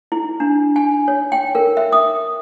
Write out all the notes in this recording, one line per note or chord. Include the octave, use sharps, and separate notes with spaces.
E4
D4
G#5
C#5
G5
A#4
E5
D#6